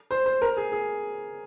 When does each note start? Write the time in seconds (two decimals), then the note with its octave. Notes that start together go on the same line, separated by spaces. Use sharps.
0.11 C5
0.26 C5
0.42 A#4
0.57 G#4
0.72 G#4